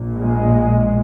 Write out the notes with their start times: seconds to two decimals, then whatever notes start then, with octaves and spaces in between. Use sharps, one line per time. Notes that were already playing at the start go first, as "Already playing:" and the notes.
Already playing: A#1 A#2
0.12 G#3